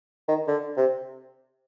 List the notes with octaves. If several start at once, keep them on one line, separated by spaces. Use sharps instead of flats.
D#3
D3
C3